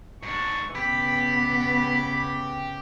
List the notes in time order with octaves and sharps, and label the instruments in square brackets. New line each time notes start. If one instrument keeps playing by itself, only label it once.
[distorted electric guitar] G#2 D4 [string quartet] C#6
[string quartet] C#3 E3 [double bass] B3 [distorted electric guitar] G4 [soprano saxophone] B5